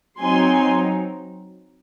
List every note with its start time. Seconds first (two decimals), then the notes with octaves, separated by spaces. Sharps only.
0.20 F#3 C4 D#4 G#5 C6